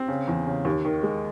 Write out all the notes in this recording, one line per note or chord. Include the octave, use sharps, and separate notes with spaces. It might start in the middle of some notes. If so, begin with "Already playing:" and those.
Already playing: C4
C#3
E2
C#3
D#2
D#3
G#3